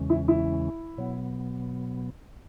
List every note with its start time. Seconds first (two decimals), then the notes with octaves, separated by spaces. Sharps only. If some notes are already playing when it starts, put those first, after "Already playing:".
Already playing: E2 C#3 E3 G#3 C#4
0.10 E4
0.28 E4
0.98 B2 F#3 B3